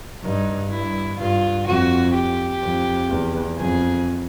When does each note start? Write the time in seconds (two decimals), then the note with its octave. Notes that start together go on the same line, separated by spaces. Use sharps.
0.23 G2 D#4
0.71 G2 E4
1.18 G2 F4
1.67 F2 F#4
2.14 G4
2.62 F2
3.10 E2
3.58 F2 G#4